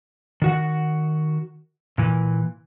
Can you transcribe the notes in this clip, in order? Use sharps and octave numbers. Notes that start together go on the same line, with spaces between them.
D#3 F#4 F#5
A#2 E3